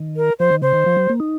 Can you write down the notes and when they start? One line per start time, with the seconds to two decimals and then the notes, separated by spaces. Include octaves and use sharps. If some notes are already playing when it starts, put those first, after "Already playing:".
Already playing: D#3
0.17 A#4
0.39 F3 C5
0.51 D#3
0.62 C#3 C5
0.74 D#3
0.86 F3
0.97 F#3
1.09 A#3
1.20 D#4